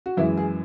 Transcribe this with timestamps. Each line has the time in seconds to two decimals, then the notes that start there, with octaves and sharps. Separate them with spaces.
0.06 F#4
0.17 F#2 E3 G#3 E4
0.37 G#4